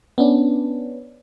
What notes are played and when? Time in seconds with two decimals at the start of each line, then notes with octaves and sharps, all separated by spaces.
0.18 B3 C#4 D4